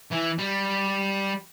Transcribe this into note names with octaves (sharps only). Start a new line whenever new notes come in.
E3
G3